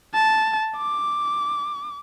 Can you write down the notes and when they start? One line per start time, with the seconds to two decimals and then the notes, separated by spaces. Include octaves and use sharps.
0.14 A5
0.77 D6